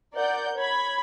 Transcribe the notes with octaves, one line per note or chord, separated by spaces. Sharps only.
A#4 D5 F#5 G6
C#5 B5 G#6